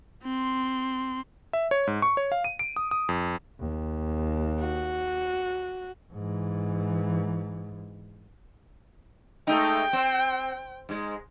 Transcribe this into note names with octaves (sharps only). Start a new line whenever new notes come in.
C4 C6
E5
C#5
G#2
C#6
C#5
F5
D#7
D7
D#6
D#6
F2
D#2
F#4
G#2 E3
G#3 A3 D#4 G5
C4
G#2 G#3